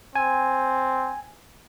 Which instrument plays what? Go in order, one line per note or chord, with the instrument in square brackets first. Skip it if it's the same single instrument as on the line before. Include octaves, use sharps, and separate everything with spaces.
[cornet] C4 [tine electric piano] G#5